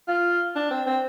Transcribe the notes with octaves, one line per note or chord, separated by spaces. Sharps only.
F4
D4
C4
C4